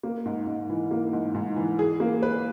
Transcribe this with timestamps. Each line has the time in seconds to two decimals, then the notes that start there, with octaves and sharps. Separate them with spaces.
0.03 A#3
0.26 G#2
0.47 G#2
0.69 E3
0.91 A#3
1.13 G#2
1.35 G#2
1.56 E3
1.79 G#4
2.00 A#3
2.23 B4